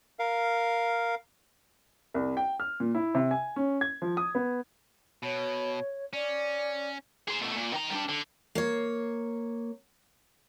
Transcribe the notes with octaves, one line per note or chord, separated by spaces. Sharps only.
A#4 F5
C2
G5
F6
A#2
E4
C3
G#5
C#4
G#6
F3
D#6
B3
B2 C#5
C#4 D5
G#4 C5
B2 A3
A#2
D#3 A#5
G3 D4
D3
A#3 C#5